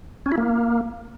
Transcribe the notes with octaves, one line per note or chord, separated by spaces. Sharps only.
C#4
E4
A#3